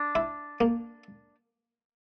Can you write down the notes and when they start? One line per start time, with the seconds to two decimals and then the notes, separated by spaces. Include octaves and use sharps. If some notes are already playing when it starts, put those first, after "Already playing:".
Already playing: D4
0.15 E4
0.61 A#3